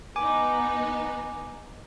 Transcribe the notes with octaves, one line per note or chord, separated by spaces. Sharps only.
B3 D#4 G#5 D6